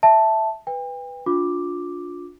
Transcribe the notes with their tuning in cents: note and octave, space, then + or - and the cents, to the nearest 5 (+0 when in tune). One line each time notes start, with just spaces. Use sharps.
E5 +0 A5 +0
B4 +0 G5 +40
D4 -15 F4 +25 D6 +0